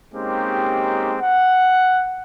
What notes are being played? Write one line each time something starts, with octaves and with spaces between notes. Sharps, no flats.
G#3 A#3 C4 C#4 D#4 G4
F#5